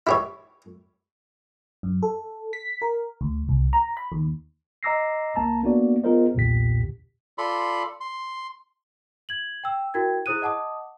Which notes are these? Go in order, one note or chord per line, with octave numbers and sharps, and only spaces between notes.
E4 G4 C#5
F#2
A4
B6
A#4
D2
C2
A#5
B5
D#2
D#5 A#5 D6 E6 A#6 C7
C#2 A#3 A5 A#5
A#3 B3 D4 F#4 D5
B3 F4 G#4 A#4 C5 D#5
B1 E2 A#2 D3 G4 B6
F4 A4 D5 B5 C6
C6
G#6 F#7
G5 E6
E4 F#4 A#4 G5 G#6
E4 G#4 C5 D#6 F#6 D#7
D#5 F#5 A5 D6 D#6